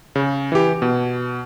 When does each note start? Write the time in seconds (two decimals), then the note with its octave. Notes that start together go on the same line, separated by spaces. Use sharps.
0.16 C#3
0.52 E3 G4
0.82 B2